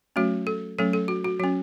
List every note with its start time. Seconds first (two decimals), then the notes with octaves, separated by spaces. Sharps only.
0.16 F#3 A3 C#4 F#4
0.47 A4
0.79 F#3 A3 C#4 A4
0.93 A4
1.08 F#4
1.24 F#4
1.40 F#3 C#4 F#4